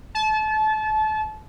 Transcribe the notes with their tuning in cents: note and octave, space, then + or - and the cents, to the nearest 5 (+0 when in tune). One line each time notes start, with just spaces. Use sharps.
A5 -30